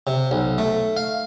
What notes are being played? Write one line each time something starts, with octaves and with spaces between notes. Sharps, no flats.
C3
B1
A3
F5